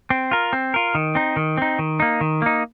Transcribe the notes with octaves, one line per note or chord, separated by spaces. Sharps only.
C4
F4 A#4
C4
F4 A#4
D#3
C4 D#4
D#3
C4 D#4
D#3
A#3 D#4
D#3
A#3 D#4